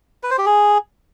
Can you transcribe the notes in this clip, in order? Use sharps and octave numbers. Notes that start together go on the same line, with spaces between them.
B4
C5
G4
G#4